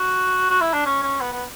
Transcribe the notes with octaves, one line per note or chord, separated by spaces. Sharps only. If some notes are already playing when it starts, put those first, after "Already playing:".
Already playing: F#4
F#4
E4
D4
C#4
C#4
B3
B3